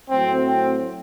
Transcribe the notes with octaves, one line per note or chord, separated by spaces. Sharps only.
A2 F#3 A3 C4
C4